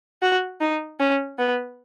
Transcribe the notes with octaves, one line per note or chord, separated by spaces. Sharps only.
F#4
D#4
C#4
B3